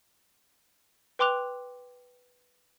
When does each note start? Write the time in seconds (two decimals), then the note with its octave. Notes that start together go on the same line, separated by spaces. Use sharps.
1.19 B4 G5 C6 D6 F#6 F7